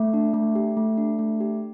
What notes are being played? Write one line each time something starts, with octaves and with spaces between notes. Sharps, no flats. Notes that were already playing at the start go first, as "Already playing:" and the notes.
Already playing: A3
D4
A3
G4
A3
D4
A3
G4